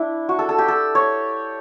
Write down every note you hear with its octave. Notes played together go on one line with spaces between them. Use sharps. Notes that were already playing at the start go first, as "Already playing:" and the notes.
Already playing: D4 E4
F#4
A4
A4
G4
A4
C#5